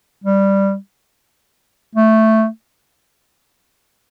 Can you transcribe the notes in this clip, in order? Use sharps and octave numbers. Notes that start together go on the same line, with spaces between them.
G3
A3